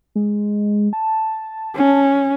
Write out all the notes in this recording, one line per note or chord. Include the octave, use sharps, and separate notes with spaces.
G#3
A5
C#4